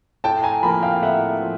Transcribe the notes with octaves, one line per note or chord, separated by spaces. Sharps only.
A2 G5 A5
G#5 A#5
F3 A#3 A5 B5
F5 G5
G5
A2 E5 F#5
F3